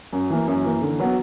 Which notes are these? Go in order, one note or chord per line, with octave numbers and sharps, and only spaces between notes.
F#2
E3 A#3
F#2
E3 A#3
D3
F#3 B3